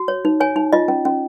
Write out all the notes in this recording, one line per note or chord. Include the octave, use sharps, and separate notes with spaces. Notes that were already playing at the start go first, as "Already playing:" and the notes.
Already playing: F#4
C#5
D#4
C#5 G#5
D#4
F4 D#5
C#4
C#4